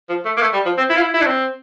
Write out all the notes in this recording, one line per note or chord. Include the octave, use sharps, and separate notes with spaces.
F3
A3
A#3
A3
G3
F3
C4
E4
F4
E4
E4
D4
C4